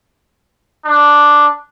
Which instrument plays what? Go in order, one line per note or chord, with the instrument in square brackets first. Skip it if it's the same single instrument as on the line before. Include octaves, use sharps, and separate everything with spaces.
[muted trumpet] D4